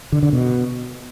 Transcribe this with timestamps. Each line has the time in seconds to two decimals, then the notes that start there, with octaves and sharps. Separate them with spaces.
0.12 D3
0.23 D3
0.33 B2